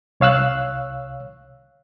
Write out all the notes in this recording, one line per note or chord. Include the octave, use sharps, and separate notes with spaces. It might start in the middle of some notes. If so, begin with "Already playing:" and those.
C2 C#5 F5 E6 F#6